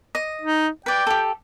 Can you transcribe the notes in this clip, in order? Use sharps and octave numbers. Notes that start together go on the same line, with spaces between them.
D#5
D#4
B4 D5 G5
G4 A4